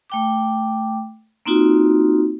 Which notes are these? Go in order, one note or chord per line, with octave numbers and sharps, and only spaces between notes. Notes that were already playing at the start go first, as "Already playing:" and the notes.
A3 G5 D6
A#3 C4 D#4 F4 F#4